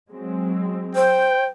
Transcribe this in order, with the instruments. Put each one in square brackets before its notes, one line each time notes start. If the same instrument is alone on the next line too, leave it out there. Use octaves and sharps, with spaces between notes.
[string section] F#3 G#3 C4
[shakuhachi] C5 [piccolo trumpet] G5